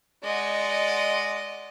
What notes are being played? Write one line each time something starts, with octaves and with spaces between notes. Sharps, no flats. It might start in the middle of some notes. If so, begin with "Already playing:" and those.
G#3 D5 D#5 F#5